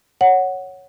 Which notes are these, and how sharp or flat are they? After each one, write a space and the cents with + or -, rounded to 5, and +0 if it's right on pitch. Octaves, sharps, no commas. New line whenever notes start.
C#5 +0 F#5 +0